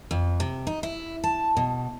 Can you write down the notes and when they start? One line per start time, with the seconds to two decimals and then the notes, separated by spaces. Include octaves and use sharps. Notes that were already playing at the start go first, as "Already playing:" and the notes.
0.11 F2
0.40 C3
0.67 D#4
0.83 E4
1.24 A5
1.57 B2